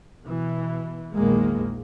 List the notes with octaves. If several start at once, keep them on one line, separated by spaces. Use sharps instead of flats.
B2 E3
A#1 E2 D#3 G#3 A#3